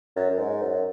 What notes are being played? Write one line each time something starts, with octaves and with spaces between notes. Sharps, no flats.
F#2
F#2
G#2
F#2